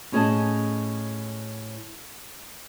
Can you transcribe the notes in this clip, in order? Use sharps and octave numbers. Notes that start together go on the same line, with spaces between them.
A2 C#4 G#4 C#5 D#5 A5